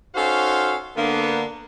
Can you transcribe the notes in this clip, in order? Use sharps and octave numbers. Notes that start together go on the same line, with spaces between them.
C#4 D#4 F#4 A4 C5 F5
D3 A#3 B3